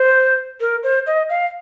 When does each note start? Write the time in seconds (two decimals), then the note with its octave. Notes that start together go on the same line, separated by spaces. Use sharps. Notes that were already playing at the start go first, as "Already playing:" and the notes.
Already playing: C5
0.60 A#4
0.83 C5
1.06 D#5
1.29 F5